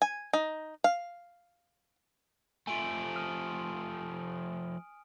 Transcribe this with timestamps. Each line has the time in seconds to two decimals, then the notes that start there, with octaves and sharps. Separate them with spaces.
0.02 G#5
0.33 D#4
0.84 F5
2.67 F3 A3 G#5 D7 F#7
3.15 D#6 F6 D#7